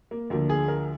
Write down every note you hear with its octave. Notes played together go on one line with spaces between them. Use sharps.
A#3
D2 D3 F3 A#3
G#4
A#4